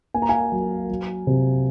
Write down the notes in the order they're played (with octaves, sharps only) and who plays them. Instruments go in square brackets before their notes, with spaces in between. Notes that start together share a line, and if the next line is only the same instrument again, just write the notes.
[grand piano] A#3 G#5
A#5
F5 G#5
F#3
F#3
C3